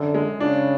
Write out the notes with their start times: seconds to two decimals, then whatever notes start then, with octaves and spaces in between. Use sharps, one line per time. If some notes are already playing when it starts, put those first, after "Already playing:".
Already playing: F#2 D3
0.15 G#3
0.40 C#3 D4